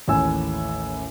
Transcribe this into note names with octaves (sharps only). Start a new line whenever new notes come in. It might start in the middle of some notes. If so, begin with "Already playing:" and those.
A1 D#2 A2 G#5 E6